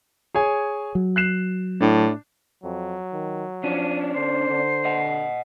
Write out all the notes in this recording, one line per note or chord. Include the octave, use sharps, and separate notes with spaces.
G#4 C#5 G#5
F#3
F#6 C7 E7
A2 D4
F2 F#3
D#3
F3 C#4 D4 D#7
D3 C5 C7
D3
D#5 F#5